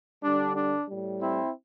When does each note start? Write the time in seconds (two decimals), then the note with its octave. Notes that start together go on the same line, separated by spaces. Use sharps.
0.23 D3 G3 D4
0.56 D4
0.89 A2 G3
1.21 C4 E4